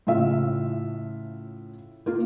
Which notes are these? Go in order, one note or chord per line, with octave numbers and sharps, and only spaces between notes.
A2 C#3 F4 E5
A#3 F4